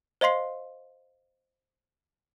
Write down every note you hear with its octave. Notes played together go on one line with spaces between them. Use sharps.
C5 D#5 F5 C6 C7